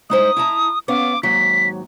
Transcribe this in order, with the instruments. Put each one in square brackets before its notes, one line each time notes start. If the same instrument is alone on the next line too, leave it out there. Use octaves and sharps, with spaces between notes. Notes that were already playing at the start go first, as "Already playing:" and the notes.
[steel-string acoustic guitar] G#3 D#4 C5 [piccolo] D#6
[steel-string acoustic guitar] E4 A5 A#5
[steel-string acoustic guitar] B3 C#4 F5 [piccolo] D6
[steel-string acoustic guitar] D#2 G#2 F#3 [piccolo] B6